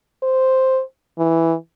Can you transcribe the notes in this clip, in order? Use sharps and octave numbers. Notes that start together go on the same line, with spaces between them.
C5
E3